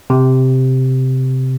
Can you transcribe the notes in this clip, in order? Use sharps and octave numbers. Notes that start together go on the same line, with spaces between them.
C3